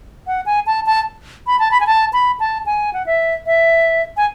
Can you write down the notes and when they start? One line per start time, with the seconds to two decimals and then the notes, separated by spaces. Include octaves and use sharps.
0.27 F#5
0.46 G#5
0.66 A5
0.86 A5
1.47 B5
1.59 A5
1.71 B5
1.80 G#5
1.87 A5
2.13 B5
2.40 A5
2.66 G#5
2.93 F#5
3.06 E5
3.46 E5
4.17 G#5